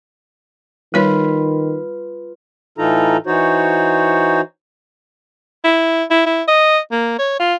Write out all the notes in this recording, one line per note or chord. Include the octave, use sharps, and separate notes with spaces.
D#3 G3 F4 B4 C#5
A2 E3 D#4 F4 A4 A#5
E3 D#4 F#4 C5 C#5
E4
E4
E4
D#5
A#3
C#5
F4